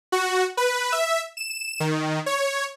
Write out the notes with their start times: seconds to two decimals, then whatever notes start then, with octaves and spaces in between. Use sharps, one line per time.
0.12 F#4
0.57 B4
0.92 E5
1.37 E7
1.80 D#3
2.26 C#5